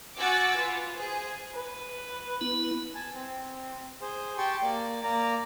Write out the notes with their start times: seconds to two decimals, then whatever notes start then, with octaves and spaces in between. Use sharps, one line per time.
0.18 F#4 F#5 G#5 D6 E6 A6
0.57 F4 B4
0.97 G#4 C5
1.54 B4
2.41 B3 E4
2.95 G#5 A5
3.14 C4
4.01 G#4 C5
4.38 G4 G5 A5 C6 C#6
4.62 A#3 D5
5.03 A#3 D5 A#5